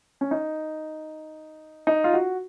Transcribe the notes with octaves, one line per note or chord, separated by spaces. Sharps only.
C#4
D#4
D#4
F4
F#4